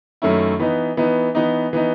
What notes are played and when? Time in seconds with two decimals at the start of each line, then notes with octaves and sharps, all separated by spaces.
0.22 F#2 D#3 A3 C#4 E4
0.59 E3 B3 D#4
0.97 E3 B3 D#4
1.35 E3 B3 D#4
1.73 E3 B3 D#4